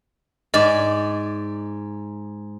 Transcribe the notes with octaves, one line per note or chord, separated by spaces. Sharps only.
G#2 D5 D#5